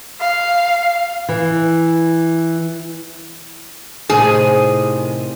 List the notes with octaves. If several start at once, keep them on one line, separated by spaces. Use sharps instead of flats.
F5
E3
A2 C3 D#3 G#4